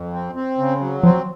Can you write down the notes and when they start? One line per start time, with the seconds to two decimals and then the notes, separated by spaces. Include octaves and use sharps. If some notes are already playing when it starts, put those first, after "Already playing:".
Already playing: F2
0.13 C4
0.35 C4
0.58 C#3
0.81 F#3
1.03 F3 C4